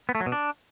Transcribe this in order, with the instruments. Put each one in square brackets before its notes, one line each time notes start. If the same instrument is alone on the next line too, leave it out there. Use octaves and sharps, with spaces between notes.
[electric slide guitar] B3
A3
F#3
B2
D4